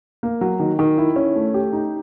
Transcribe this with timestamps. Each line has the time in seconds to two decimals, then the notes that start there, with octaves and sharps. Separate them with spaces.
0.23 A#3
0.41 F#3
0.60 D#3
0.79 D#3
0.98 E4
1.16 C#4
1.36 A3
1.54 G4
1.73 D#4